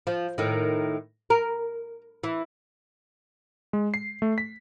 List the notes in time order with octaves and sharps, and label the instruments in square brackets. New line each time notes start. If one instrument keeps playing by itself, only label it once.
[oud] F3
A2 D#3
A#4
E3
[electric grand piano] G#3
C7
A3
B6